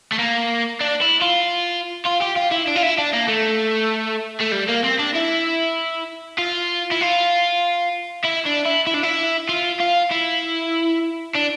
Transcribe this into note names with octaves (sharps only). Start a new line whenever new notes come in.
A3
A#3
D4
E4
F4
F4
G4
F4
E4
D4
F4
E4
D4
A#3
A3
A3
G3
A#3
C4
D4
E4
F4
E4
F4
E4
D4
E4
E4
D4
E4
F4
F4
E4
D4